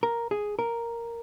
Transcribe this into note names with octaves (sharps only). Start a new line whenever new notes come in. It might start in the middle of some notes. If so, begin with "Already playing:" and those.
A#4
G#4
A#4